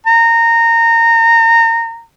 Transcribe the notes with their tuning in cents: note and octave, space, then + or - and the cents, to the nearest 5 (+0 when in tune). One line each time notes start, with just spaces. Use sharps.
A#5 -20